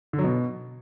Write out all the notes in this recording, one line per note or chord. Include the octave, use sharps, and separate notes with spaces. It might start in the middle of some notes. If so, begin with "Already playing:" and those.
D3
F#3
B2